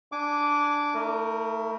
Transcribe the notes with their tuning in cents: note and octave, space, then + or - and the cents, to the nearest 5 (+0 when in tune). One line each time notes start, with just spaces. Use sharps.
D4 +0 G#5 +0 D6 -15
A3 +25 E4 -45 A#4 -15